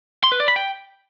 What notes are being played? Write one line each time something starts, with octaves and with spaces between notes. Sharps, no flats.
C6
B4
D5
B5
G5